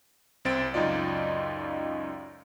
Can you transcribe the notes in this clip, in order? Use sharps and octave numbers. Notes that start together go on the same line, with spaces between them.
C2 C4 A6 D7
C#2 F#2 D#4 F4 D5